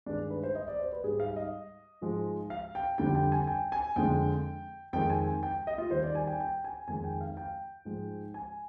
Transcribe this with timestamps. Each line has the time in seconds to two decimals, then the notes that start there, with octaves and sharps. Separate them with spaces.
0.06 G2 D#3 G#3 D4
0.30 B4
0.43 C5
0.55 D#5
0.68 D5
0.79 C5
0.92 B4
1.04 G#2 G3 G#4
1.20 F5
1.36 D#5
2.01 G#2 F3 G#3
2.50 F5
2.75 G5
2.98 F2 D3 G3 G5
3.15 G5
3.32 G#5
3.47 G5
3.72 G#5
3.96 F2 D3 G#3 G5
4.93 F2 D#3 G#3 G5
5.10 G#5
5.43 G5
5.67 D#5
5.78 F4
5.90 D#2 D#3 G3 C5
6.03 D5
6.15 G#5
6.27 G5
6.40 G5
6.64 G#5
6.88 F2 D#3 G#3 G#5
7.04 G5
7.21 F5
7.37 G5
7.85 G#2 F3 G#3
8.34 G#5